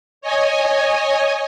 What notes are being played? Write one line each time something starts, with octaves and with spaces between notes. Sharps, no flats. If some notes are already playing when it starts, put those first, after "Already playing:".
C#5 D#5 G#5